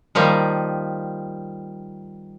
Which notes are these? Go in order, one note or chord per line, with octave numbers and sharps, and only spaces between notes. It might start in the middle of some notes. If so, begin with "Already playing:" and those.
D#3 F3 G3 A#3